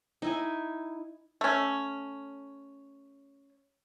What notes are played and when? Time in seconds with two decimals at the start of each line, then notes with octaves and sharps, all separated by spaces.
0.22 D#4 E4 G#5
1.41 A3 C#4